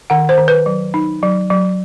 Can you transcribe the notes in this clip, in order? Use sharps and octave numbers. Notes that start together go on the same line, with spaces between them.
D#3 F#5
C5
D#3
B4
F#3
D#4
F#3
F#3